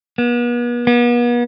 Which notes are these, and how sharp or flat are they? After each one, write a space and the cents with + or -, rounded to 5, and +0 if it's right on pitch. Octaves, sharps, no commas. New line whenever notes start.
B3 -40
B3 -40